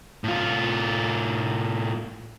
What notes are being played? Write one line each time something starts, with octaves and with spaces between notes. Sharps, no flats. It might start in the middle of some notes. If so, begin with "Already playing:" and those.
A2 F4